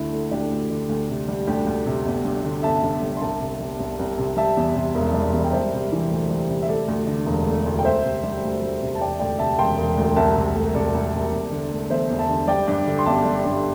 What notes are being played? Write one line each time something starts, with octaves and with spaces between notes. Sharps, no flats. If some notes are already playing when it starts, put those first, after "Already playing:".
Already playing: D2 D3 E4
A3
D2 D4 G4
D2
D3
D2
C3
G3
D2 D4 G4
D2
C3
G1
G2
D3
G1 E5 A5
G1
G2
C6
C2 E5 A5
C3
G3
C2
C2
C3
G3 E5 A5
E2
C3
E1
G3
E2
G5
G3 C5 E5
C3
E3
D2
G3
C3
E5
A3 A4 D5
D2
D3
E1
A3
D2
G5
D2 C5 E5
C3
G3
D2
D2
C3
A5
E1 D5 G5
D2 D5 G5
C3 E5 A5
E1 G5 C6
E1
D2
C2 E5 A5
C3
A3
C2 A4 D5
C2
C3
E2
D3
A3
E2 C5 E5
E2
E5 A5
D3
G3 D5 G5
G2
D3
C6
G1 E5 A5
G3
G2